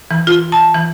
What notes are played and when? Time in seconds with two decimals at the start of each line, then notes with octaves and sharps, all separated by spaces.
0.11 E3
0.27 F4
0.52 A5
0.74 E3